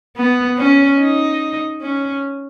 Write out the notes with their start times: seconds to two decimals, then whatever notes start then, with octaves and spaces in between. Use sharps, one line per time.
0.17 B3
0.58 C#4
0.99 D#4
1.81 C#4